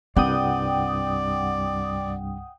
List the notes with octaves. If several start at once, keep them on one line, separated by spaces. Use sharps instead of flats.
C2 G2 G3 C4 D5 F#5 G5 D#6